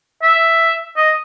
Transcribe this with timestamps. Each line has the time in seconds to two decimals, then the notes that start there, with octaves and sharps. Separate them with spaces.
0.22 E5
0.96 D#5